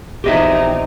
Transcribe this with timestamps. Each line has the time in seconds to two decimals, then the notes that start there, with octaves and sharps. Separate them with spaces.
0.24 A#1 E2 C4 D#4 G4 D#5 E5